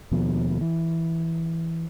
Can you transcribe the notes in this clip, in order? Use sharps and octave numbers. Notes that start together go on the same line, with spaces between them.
D#2 B2 F3
E3